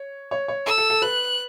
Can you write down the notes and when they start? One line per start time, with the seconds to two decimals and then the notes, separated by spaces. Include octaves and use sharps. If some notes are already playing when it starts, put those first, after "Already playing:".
Already playing: C#5
0.31 C#5
0.48 C#5
0.66 A4 E6
0.78 A4
0.90 A4
1.02 B4 F#6